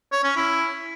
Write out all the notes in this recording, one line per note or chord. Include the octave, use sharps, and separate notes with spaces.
C#5
C#4
E4